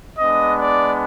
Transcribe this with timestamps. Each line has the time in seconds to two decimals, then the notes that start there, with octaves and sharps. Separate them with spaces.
0.19 G#3 B3 D4 D#5
0.58 D5